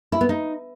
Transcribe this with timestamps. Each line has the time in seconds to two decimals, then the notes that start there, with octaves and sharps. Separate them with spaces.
0.12 E4
0.21 B3
0.29 D#4